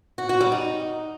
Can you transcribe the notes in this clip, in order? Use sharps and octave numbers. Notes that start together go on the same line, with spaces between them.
F#4
F#4
G3
D#4